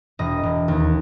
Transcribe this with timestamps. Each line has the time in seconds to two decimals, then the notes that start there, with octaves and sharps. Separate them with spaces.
0.19 E1 D#5
0.43 E1
0.68 D#2